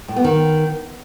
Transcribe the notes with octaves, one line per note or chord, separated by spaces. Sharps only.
A2
B3
D#3